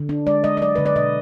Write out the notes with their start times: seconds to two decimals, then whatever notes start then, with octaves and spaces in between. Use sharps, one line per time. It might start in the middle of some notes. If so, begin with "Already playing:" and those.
Already playing: D3
0.09 D4
0.27 G#3 D5
0.44 G#3 D#5
0.57 D#5
0.61 F#3 D5
0.75 D3 B4
0.86 D5
0.96 B2 D#5